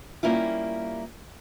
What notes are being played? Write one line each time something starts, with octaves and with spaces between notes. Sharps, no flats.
G3 A#3 C#4 E4 F4